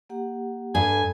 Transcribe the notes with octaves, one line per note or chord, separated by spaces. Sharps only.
A#3 G4 F#5
G2 A4 G#5